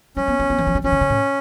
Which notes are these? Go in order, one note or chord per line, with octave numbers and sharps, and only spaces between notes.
G3 C#4
B3
A3
B3
E3
F#3
G3
F#3 C#4
D3
C#3
A2